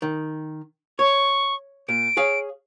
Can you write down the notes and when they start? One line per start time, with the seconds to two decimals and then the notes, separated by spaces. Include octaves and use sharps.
0.02 D#3
0.99 C#5 C#6
1.89 A#2 D7
2.17 G#4 C#5 F5